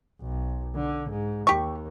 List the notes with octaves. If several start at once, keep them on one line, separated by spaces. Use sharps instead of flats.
B1
D3
G#2
D#2 G4 C#6